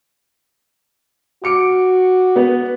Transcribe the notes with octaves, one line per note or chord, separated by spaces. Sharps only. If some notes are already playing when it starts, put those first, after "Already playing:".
F#4 D6 C#7 D7
B3 B4